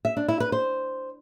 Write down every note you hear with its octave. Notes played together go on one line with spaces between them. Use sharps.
E5
D4
E4
B4
C5